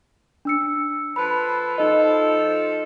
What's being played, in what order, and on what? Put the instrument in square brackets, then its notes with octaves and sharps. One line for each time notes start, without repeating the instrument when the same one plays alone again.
[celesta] D4 E6 C#7
[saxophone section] F3 A4 B4 [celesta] B5
[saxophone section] F3 A4 [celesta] D#4 D#5